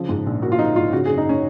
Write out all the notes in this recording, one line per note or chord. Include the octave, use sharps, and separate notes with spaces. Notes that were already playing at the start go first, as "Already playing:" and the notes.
Already playing: C#3 F3
G#2
A#1
A#3 F#4
F4
F3 D#4
G#2 F4
C#3 F#4
F#2 G#4
D#4
C#4